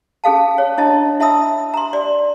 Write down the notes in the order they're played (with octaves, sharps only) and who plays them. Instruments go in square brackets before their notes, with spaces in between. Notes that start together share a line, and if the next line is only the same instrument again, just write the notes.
[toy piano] C#4 G#4 A4 F5 A5
C#5
D4 E4 D#5 A5
E4 E5 A5 B5 D#6 E6
A#5 C6
D5 C6